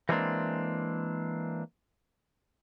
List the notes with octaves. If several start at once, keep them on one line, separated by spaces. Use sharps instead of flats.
E3 G3 G#3 A#3 C4 D4